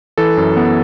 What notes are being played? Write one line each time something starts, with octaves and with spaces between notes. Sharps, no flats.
E3 A4
F#2
B3